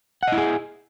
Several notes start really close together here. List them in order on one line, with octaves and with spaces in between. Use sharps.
F#5 D#5 E4 G#4